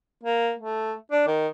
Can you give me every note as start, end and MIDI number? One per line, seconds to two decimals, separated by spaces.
0.23 0.52 58
0.59 0.93 57
1.12 1.22 62
1.27 1.47 51